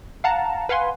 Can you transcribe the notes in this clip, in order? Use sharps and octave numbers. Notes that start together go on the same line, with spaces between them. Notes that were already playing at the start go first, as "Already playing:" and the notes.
F5 F#5 A5 A#5
B4 F5 F#5 G#5 C6